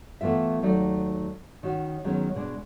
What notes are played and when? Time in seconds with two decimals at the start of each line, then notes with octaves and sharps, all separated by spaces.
0.21 E3 A3 B3 F4 E5
0.63 D#2 F#3 A3 D#4 D5
1.63 D#3 C#4 F#4
2.05 D#3 F#3 G#3 B3 C#4
2.35 B2 G#3 D4